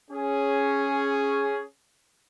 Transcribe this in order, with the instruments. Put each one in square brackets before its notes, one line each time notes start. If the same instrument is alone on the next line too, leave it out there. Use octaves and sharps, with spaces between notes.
[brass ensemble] C#4 G#4